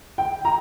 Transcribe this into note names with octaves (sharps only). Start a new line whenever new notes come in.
G5
A#5